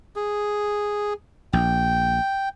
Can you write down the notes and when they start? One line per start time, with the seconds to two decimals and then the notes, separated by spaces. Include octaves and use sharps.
0.16 G#4
1.53 A#1 G5